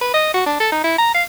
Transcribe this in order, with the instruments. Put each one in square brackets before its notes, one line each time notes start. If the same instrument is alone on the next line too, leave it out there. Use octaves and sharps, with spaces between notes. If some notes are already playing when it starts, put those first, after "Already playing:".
[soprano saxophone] B4
D#5
F#4
D4
A4
D#4
E4
A#5
F5